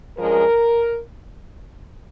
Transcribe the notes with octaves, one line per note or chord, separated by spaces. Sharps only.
G2 F3 G#3 C#4 A#4